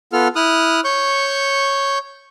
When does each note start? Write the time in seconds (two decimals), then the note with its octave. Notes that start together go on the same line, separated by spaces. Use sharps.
0.13 B3 F4 A4 F6
0.36 E4 D#6 F6 F#6
0.84 C#5 C#6 G6